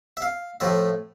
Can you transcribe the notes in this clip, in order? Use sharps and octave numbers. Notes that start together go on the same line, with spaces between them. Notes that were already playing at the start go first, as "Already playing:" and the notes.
E5
F5
A2 F3 A3 E5